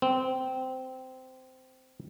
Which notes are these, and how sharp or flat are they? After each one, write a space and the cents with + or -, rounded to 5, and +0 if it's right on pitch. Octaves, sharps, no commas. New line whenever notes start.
C4 -15